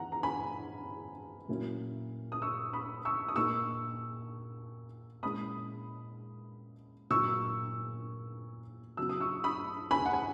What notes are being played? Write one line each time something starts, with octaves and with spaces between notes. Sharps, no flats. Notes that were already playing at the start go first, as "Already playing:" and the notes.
Already playing: E3 E4 F#5 A#5
A#5
G#5 B5
A#2 F#3 A#3 C#4 E4
D#6
C#6 E6
B5 D#6
C#6 E6
D#6
A#2 A#3 D#4 C#6 E6
A#2 G#3 C#4 E4 B5 D#6
A#2 F#3 A#3 D#4 C#6 E6
C#3 F#3 B3 E6
D#6
C#6 E6
B5 D#6
G#5 B5
F#5
G#5